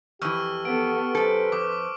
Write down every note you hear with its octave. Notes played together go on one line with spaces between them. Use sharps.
F2 E3 G4 C#6 E6 F6
B3 A4 D7
F#2 A4 B4 C5
F2 D6